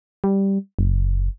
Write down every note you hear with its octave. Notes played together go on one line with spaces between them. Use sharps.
G3
F#1